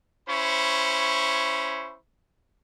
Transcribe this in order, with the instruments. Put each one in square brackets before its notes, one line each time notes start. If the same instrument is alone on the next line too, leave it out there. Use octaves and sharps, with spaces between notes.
[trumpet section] C#4 E4 C5 B5 C#6